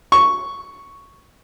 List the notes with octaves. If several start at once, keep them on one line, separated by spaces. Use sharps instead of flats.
C#6